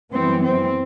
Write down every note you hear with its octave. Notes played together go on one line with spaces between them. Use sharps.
F#2 E3 G3 B3 C4
C4